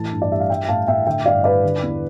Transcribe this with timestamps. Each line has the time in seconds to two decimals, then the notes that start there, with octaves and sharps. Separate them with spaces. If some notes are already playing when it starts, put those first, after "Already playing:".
Already playing: A2 E3 A5
0.12 G2
0.22 D5
0.31 G3 E5
0.40 F5
0.50 G3 E5 G5
0.68 A2 F5 A5
0.87 A2 E5 G5
1.07 D3 E5 G5
1.26 G2 D5 F5
1.44 G3 B4 D5
1.63 D3
1.83 E2